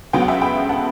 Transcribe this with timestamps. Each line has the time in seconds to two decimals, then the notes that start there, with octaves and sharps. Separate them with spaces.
0.13 C#2 C#3 F#3 B3 G5
0.22 F#5
0.28 E5 G5
0.41 G5 B5
0.69 F#5 A5